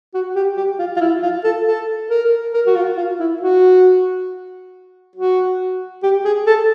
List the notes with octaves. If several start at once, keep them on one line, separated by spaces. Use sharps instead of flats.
F#4
G4
G4
F4
F4
E4
F4
A4
A4
A#4
A#4
F#4
F4
F4
E4
F#4
F#4
G4
G#4
A4